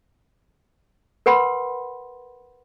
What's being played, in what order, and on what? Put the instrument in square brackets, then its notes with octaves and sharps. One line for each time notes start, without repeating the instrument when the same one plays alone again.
[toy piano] A#4 B4 F#5 B5 C6